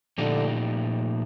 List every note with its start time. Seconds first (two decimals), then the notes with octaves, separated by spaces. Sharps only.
0.18 A#2 D3 F3 A3 D#4 G4